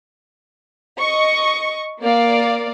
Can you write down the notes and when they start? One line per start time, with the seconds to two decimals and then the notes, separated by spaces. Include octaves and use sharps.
0.99 D#5 C#6
2.02 A#3 D5 F5